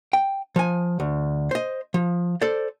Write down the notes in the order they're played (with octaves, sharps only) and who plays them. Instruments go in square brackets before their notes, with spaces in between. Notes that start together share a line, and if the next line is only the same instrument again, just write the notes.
[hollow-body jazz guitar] G5
F3 G#5
D2
C5 D#5
F3
A4 C5 D5